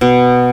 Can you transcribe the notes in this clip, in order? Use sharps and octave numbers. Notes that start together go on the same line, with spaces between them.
B2